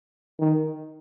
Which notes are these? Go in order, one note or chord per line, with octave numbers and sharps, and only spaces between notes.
D#3